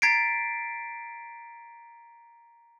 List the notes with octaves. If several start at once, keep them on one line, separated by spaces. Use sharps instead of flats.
A#5 G#6 A6 B6 C7 D7